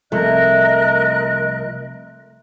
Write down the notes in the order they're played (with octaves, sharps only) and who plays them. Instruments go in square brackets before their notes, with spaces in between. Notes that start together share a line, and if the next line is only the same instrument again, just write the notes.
[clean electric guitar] C2 F3 [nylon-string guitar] A3 [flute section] A#4 D#5 F#6